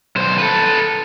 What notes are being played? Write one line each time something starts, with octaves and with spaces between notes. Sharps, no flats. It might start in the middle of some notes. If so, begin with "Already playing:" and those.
B1 C5
A4 B4